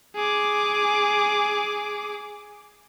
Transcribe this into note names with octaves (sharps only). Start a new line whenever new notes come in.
G#4 D6